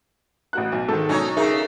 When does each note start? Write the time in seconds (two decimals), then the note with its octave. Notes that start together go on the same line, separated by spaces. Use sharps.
0.53 A1 F#4 F#6
0.72 B1
0.88 G#2 D#3 A4 A5
1.09 B1 C#4 D#4 C#5
1.37 C#3 D#4 G#4 A#4 E5